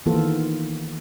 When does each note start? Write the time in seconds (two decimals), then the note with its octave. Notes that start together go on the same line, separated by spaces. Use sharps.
0.06 D#3 E3 A#3 B3 F4 A4